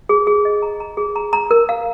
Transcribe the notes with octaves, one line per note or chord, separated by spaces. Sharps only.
G#4
G#4
D#5
A#5
A#5
G#4
A#5
A#5
A#4
F5